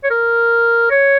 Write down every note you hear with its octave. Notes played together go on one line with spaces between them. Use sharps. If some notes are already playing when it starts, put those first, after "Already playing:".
C#5
A#4
C#5